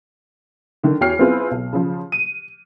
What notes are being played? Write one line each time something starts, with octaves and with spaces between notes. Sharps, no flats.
D3 D#3
E2 F#4 C#5 G5 F6 C7
B3 C4 E4 F4 G#4 B4
B1
C#3 F3
D#7